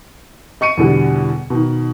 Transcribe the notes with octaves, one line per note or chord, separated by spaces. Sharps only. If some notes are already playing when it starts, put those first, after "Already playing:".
D#5 C#6 C#7 D#7
E2 B2 D3 G3
B2 D#3